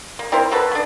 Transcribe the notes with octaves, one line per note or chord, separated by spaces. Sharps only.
A#3
C4 E4 A#4 C5
A#3 F#4 A4 B4
B3 D4